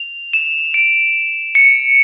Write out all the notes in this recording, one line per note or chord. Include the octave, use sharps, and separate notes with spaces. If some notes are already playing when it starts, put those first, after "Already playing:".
Already playing: F7
E7
D7
C#7